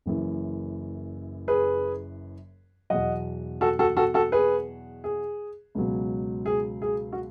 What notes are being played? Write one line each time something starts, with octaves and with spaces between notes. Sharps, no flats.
F#1 F#2 E3
G#4 B4
E2 B2 F#3 D#5 F#5
F#4 A4
F#4 A4
F#4 A4
F#4 A4
G#4 B4
G#4
C#2 B2 F#3
G#4
G#4
F#4